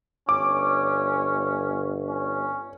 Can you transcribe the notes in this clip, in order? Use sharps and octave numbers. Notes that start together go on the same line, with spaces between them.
G1 C#4 D6
C#4